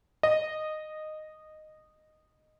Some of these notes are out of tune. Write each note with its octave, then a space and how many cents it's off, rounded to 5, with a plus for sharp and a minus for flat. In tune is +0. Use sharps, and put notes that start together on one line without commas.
D#5 -10